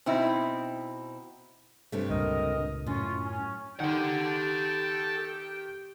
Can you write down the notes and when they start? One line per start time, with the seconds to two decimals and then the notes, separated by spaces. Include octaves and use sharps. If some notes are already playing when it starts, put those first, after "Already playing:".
0.06 B2 C4 D#4 E4
1.92 G2 C3 A3
2.10 C#2 A#2 A#4 D#5
2.86 F#2 A2 C#4 F4
3.25 C#4
3.80 D#3 G4 A4 F#5 G5